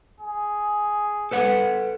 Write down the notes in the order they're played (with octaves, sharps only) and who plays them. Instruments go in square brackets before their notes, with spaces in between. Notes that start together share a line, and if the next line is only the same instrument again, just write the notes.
[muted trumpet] G#4
[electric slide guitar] A4 B4 F#5